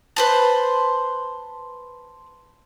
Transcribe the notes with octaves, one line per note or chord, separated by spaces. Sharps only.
B4 C5 A5